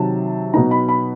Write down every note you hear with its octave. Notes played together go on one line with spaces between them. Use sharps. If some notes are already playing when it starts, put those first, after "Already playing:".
Already playing: C3 D#3 F#3 A5
B2 F#3 B3 D#4 A#5
B5
B5